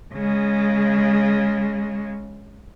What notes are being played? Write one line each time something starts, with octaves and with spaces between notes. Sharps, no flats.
C#3 G#3